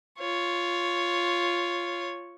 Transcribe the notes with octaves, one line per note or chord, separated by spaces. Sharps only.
F4 C#5